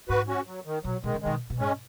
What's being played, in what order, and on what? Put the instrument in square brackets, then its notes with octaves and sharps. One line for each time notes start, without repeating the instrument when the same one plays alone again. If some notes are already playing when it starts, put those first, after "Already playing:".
[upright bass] G#2 [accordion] F#4 B4
[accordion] C#4 F#4
F#3
D#3
[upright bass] B2 [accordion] F#3
[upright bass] B2 [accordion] D#3 G#3
[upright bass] C#3
[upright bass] B2 [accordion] D#3 G#3
[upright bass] B2
[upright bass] G#2 [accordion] G#3 C#4